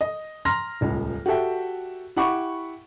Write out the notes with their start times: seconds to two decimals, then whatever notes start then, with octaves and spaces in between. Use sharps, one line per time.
0.01 D#5
0.45 A#5 C6 F6 A#6
0.81 D#1 C#2
1.26 F#4 G4 A4 E5 G5
2.17 E4 G4 F#5 B5 C#6 D6